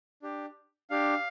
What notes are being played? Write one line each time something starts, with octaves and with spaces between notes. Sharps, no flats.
D4 G4
D4 G4 F5